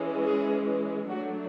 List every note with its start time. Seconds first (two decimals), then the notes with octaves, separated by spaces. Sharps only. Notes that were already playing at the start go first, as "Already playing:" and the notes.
Already playing: E3 G#3 C#4
0.23 G#4
1.09 F#3 A3 D4 F#4